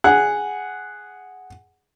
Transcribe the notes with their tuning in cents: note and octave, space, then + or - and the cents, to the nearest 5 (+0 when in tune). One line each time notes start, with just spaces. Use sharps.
G#4 +0 F#5 +0